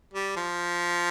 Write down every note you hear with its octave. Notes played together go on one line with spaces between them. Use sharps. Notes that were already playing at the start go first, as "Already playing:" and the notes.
G3
F3